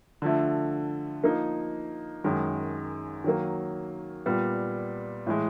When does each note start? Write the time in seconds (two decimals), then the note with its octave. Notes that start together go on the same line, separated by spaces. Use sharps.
0.22 D3 F3 A3
1.23 F3 A#3 D#4
2.24 F#2 D#3 G#3
3.24 D#3 F#3 A#3
4.26 A#2 G3 B3
5.27 A2 E3 G#3